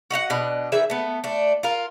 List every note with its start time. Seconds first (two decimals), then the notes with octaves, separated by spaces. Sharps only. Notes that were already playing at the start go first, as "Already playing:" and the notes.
0.11 F#4 D#5 F5 F#5
0.30 B2 D4 D#5
0.72 D#3 E3 G#4 E5
0.90 A3 B3
1.24 A3 D4
1.63 F4 A#4